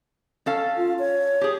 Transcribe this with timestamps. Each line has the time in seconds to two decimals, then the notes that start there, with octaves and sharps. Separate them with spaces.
0.46 C#4 A4 F5
0.76 F4
0.99 C#5
1.41 G4 G#4